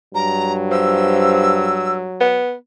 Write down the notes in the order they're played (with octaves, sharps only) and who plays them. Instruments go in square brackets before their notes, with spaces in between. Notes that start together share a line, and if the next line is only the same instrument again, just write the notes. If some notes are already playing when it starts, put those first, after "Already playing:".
[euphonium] G2 [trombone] F#3 [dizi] A#5
[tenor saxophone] F3 [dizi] E6
[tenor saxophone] B3